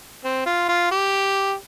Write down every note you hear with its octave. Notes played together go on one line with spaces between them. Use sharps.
C4
F4
F4
G4